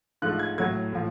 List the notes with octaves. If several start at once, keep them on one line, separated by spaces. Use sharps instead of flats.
G#2 F3 A3 F#6
G#6
A2 F#3 A3 G#6
A2 F3